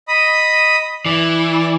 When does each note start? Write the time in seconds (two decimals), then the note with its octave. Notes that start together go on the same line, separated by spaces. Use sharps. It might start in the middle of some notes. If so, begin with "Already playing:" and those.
0.08 D#5 B5 D#6
1.06 E3 D5